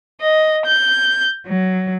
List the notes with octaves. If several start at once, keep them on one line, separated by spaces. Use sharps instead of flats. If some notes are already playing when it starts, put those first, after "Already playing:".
D#5
G6
F#3